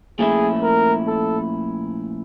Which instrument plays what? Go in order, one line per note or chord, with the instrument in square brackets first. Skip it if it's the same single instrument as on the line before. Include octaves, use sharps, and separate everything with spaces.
[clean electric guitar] A#2 F3 A3 C#4 E4 [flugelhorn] G#4
[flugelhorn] A#4
A4